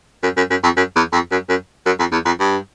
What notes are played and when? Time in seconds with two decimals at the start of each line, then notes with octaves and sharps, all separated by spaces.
0.23 F#2
0.37 F#2
0.50 F#2
0.64 F2
0.77 F#2
0.96 E2
1.13 F2
1.31 F#2
1.49 F#2
1.86 F#2
1.99 F2
2.12 E2
2.25 F2
2.40 G2